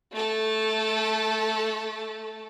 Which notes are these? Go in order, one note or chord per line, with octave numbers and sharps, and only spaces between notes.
A3 A4